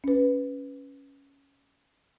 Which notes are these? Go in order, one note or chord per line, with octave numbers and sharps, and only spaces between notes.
C#4 B4